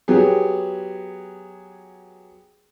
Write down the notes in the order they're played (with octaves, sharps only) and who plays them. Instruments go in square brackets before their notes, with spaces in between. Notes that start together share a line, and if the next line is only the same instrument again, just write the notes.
[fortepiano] F#3 B3 G4 G#4